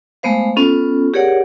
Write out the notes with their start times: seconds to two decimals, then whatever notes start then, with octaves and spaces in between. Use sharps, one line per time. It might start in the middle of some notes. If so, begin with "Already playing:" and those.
0.23 G#3 A3 B3 C5 F5
0.56 B3 C#4 F4 A4
1.14 G4 G#4 A#4 C#5 D5 F#5